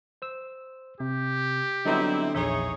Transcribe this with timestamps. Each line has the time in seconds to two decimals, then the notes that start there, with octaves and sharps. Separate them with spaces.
0.22 C5 E6
1.00 C3 G4
1.85 D3 F#3 G3 B3 C4 D#4 E4
2.35 A#1 E2 D#4 G#4 C#5 E5